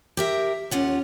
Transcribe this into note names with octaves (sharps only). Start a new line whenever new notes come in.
G4 A#4 E5
D#2 C#4 F4 F#5